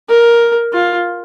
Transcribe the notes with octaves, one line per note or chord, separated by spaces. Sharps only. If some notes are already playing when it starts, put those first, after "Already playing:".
A#4
F4